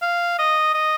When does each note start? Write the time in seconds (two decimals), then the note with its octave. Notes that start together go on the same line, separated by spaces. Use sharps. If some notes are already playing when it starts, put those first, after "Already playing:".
0.02 F5
0.39 D#5
0.74 D#5